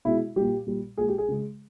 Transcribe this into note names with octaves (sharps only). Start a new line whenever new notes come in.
B2 G#3 E4
A#2 G3 G4
A#2 G3
A#2 G#3 G#4
G4
G#4
C#3 G#3